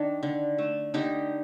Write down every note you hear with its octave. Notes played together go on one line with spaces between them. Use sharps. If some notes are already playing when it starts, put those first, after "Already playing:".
Already playing: D#3 D4
D3
A3
D3 D#4 G4